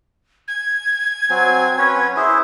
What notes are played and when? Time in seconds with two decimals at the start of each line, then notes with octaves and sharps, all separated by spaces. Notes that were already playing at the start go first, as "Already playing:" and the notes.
0.47 G#6
1.30 F#3 C4 G#5
1.78 C#4 B4 C#5
2.16 E4 G#4 C5